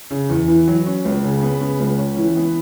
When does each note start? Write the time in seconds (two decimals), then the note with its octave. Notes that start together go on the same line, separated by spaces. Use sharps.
0.11 C#3
0.29 E2
0.48 E3
0.68 F#3
0.86 C#4
1.05 C#2
1.24 C#3
1.43 B3
1.61 C#3
1.80 C#2
1.99 C#4
2.17 E3
2.36 B3